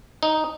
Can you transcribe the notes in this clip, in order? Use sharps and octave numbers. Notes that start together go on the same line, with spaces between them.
D#4